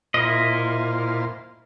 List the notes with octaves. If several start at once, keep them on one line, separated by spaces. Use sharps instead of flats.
A#2 E4 F4 C5 D#5